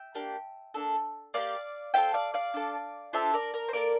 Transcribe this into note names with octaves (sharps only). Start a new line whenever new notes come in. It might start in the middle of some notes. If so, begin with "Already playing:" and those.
Already playing: E5 G5
A#3 D4 G4
A#3 D4 A4
A#3 D4 G4 D5 F5
C4 F4 A4 E5 G5
D5 F5
D5 F5
D4 A4
D4 F4 A4 C5 E5
A#4 D5
A#4
C5
A#3 E4 A4 A#4 D5